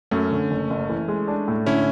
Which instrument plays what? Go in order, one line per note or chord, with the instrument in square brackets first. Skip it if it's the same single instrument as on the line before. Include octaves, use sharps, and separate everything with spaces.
[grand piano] F#2 [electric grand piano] A3 C#4
[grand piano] D3
F#1
F#1
E3
G#3
D4
A2
[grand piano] D3 [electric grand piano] C#4 E4